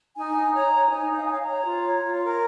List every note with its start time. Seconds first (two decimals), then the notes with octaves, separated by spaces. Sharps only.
0.17 D#4 G#5
0.35 D#4
0.53 C#5 A#5
0.73 C#5
0.91 D#4 G#5
1.10 D#4
1.16 F5
1.24 G#5
1.29 C#5 F5
1.41 A#5
1.47 C#5
1.66 F4
1.84 C#5
2.04 F4
2.22 A#4